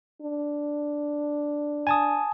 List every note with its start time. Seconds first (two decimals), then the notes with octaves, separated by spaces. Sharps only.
0.22 D4
1.87 G#5 A5 D#6